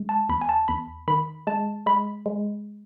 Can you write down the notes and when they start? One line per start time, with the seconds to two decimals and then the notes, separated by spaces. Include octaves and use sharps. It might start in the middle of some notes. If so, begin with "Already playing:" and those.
Already playing: G#3
0.09 A5
0.29 E2 B5
0.41 G#5
0.49 A5
0.68 E2 B5
1.08 D#3 B5
1.47 G#3 A5
1.86 G#3 B5
2.26 G#3